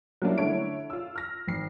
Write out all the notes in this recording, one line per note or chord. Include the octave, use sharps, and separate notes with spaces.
F#3 G3 A#3 C#4 D4 E4
D3 A3 E4 C#5 D7
F4 E6
F6 A#6
G#1 C7